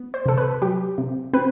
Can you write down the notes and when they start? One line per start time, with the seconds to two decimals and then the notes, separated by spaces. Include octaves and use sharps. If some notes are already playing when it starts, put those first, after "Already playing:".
Already playing: B3
0.14 C5
0.26 C3 A4
0.38 B4
0.62 F#3 G4
0.98 C3
1.33 C4 B4